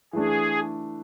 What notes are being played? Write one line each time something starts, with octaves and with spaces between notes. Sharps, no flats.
E3 A3 D4 G#4